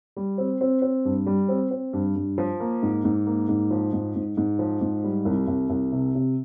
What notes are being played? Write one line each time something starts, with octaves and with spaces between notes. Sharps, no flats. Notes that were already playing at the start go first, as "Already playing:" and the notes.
G3
C4
C4
C4
G2
G3
C4
C4
G2
G2
F3
A#3
G#2
G#2
A#3
G#2
F3
G#2
G#2
G#2
F3
G#2
G3
C2
C2
C2
C3
C3